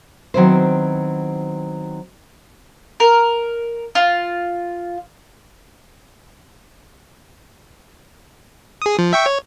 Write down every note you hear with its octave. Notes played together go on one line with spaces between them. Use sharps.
D#3 F#3 B3 C4 E4 C5
A#4
F4
G#4 D#6
F3
E5 G5 C#6
C#5